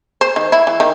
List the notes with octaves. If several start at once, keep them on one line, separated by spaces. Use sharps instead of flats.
C5
D#3
E4
E3
D#3